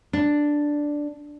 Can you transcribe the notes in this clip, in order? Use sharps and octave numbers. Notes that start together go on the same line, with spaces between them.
D4